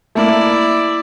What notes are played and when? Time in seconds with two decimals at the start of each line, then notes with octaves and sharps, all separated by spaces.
0.15 A3 A#3 E4 D5